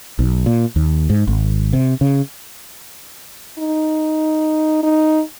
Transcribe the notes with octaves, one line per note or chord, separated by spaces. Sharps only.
B1
A#2
D#2
G#2
G#1
C3
C#3
D#4
D#4